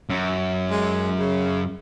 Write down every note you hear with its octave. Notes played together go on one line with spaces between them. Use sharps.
F#2
G#3
C#3